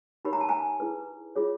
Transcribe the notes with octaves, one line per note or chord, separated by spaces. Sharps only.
D#4 G4 A#4 C#5 B5
A#5
A5
G#5 A#5
E4 G#4 B4
F4 G#4 C#5